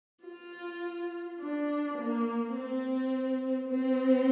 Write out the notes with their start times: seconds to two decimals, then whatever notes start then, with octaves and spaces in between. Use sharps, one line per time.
0.25 F4
1.40 D4
1.97 A#3
2.55 C4
3.69 C4